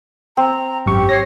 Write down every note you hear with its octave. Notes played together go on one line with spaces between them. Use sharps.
C4 A#5
G#1 F#2 G4 C#6
C#5 A#6 C7